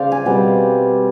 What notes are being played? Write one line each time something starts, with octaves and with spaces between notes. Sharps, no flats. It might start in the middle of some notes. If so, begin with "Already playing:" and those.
Already playing: C#3 C5 D5 F5
G#5
B2 G3 C4